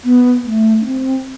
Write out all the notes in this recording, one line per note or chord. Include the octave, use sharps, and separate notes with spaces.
B3
A3
D4
C4